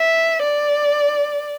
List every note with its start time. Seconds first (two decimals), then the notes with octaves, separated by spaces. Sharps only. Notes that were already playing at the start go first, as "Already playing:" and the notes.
Already playing: E5
0.43 D5